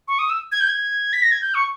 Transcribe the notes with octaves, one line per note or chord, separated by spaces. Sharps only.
C#6
D#6
E6
G#6
G6
G#6
B6
A#6
G#6
G6
C#6